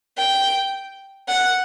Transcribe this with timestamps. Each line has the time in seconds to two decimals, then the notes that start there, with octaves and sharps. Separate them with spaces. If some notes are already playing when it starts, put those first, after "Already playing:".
0.18 G5
1.28 F#5